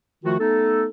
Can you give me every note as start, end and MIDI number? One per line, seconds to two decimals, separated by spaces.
0.24 0.35 51
0.24 0.35 53
0.24 0.35 57
0.24 0.35 65
0.24 0.35 66
0.39 0.85 57
0.39 0.85 59
0.39 0.85 63
0.39 0.85 69